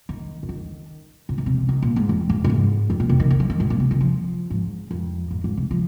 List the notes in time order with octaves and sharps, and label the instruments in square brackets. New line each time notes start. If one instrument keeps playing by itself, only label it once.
[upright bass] D#3
C3
D#3
C3
D#3
C3
D#3
A#2
G#2
F2
G#2
A#2
G#2
F2
A#2
C3
D#3
D#3
F3
D#3
G#2
A#2
C3
D#3
F3
G#2
F2
G#2
G#2
C3
F3